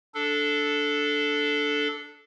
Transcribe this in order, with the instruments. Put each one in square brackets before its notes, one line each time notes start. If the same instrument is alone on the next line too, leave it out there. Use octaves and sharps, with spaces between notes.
[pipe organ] D4 A4